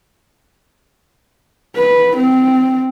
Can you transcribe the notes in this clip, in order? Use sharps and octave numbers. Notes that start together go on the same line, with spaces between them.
B4
C4